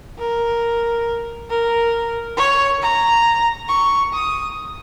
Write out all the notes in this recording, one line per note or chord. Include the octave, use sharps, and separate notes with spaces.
A#4
A#4
C#5
A#5
C#6
D#6